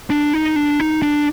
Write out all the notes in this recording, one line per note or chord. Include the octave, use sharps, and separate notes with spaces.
D4
D#4
D4
D#4
D4